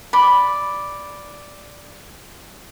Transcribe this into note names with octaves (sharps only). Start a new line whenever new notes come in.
D5 B5